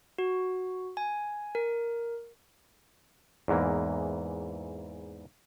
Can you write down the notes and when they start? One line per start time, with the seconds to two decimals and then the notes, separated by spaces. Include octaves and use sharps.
0.18 F#4
0.97 G#5
1.55 A#4
3.48 E2 G#2 E3 A#3